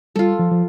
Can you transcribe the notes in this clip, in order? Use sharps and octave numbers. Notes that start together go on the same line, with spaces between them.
G3 F4 A4
F3
F3